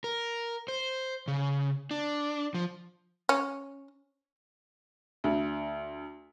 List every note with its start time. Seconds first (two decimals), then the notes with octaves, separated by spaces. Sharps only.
0.04 A#4
0.68 C5
1.28 C#3
1.91 D4
2.54 F3
3.29 C#4
5.24 D2